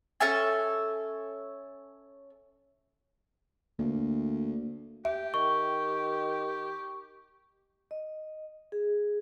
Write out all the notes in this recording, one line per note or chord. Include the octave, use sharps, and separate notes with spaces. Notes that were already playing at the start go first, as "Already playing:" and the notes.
C#4 A4 E5 G#5
D2 A#3
G4 E5
D#3 C#6
D#5
G#4